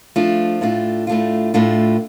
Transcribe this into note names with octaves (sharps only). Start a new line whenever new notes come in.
F3 A3 D4 F4
A2 A3 D4 F4
A2 A3 D4 F4
A2 A3 D4 F4